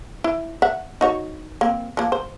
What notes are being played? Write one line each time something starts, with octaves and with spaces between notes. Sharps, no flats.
E4
E5 F#5
D#4 F#4 C#5
A#3 C4
F3 A#3
C5